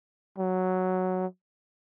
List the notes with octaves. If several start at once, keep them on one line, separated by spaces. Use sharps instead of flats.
F#3